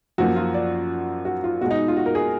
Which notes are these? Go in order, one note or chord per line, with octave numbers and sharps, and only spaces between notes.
F#2 F3 A#3 F#4
F4
D5
F#4
F4
B2 G#3 F#4
D#4
F4
F#4
A#4
G#4